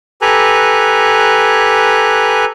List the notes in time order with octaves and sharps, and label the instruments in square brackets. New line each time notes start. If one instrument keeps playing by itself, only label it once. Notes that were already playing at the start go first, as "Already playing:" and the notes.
[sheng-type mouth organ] G4 A4 B4 G#5 A#5 F#6